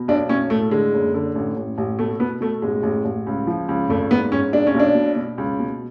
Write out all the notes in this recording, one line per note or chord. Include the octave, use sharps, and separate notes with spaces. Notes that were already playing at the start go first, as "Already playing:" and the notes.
Already playing: B2
B1 D4
B1 C#4
A2 A3
D3 G#3
F#1
D3
A1
A1
A1
B2 A3
B2 B3
B2 A3
A1 G#3
A1
A1
C#2
F3
C#2
G#1 A3
G#2 B3
G#2 C#4
B1 D4
C#4
B1
D4
B2
B2
C#2
B2